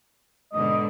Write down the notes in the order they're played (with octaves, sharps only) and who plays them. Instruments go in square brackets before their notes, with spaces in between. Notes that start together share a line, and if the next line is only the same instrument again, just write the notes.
[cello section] G#2 B2 D3 [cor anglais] D#5